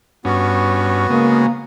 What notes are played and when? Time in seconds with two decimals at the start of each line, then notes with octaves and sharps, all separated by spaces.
0.25 G2 B3 C#4 F#4
1.10 C#3 G#3 A#3